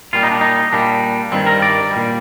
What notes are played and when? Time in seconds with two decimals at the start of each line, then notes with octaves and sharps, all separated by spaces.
0.13 A#2 G3 F4
0.23 D#4
0.32 D4
0.41 D#4
0.72 A#2 G3 D4
1.32 G2 D#3 G3 C4
1.46 A#4
1.62 D5
1.91 G3
1.96 A#2